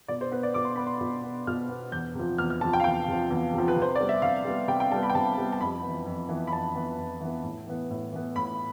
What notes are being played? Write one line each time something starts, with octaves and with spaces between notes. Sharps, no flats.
B2 D5
C5
B3 B4
D5
B2 D6
C6
B3 B5
C6
B2
B3
B2 F6
B3
E2 G6
C3 F3
E2 F6
F6
C3 F3 A5
G5
F5
E2 G5
C3 F3
E2
C3 F3
B4
C3
C5
G3 B3 D5
E5
C3 F5
G3 B3
C3 G5
G5
G3 B3 A5
B5
G5
C3 A5
G3 B3
A5
F2 B5
B3
E3
F2
E3 B3
B5
F2 A5
E3 B3
F2
E3 B3
A2
E3 B3
A2
E3 B3
A2 B5